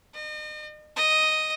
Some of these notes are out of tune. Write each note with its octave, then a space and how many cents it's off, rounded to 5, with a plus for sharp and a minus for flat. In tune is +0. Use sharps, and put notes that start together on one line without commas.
D#5 -40
D#5 +0